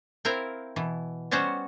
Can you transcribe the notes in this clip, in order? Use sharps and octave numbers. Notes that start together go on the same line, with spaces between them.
C4 E4 A#4 F5 G5
B2 E3
G3 B3 C#4 F#4 C5 C#5